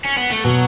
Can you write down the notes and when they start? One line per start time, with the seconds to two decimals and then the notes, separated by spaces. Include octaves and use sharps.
0.05 C#4
0.17 B3
0.31 A3
0.44 B2 F#3